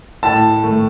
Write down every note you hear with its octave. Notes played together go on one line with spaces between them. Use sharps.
A2 A5
A3